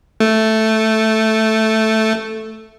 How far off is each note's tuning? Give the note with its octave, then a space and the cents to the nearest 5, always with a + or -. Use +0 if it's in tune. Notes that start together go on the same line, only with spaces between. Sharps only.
A3 +0